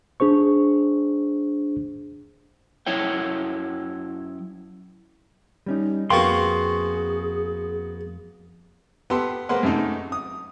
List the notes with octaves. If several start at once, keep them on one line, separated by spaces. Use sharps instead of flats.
D4 G#4 C5 C#6
F#2 E4 C#5 G5
G3 C#4 D#4
F2 A#3 B3 F#4 G#4 G5 C6 C#6
B3 G4 A4 C6
G#3 A#3 B4 C5 F#5 C6
F#2 C3 A3 D#4
D#6